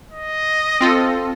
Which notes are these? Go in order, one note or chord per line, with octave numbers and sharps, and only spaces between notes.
D#5
C4 F4 A4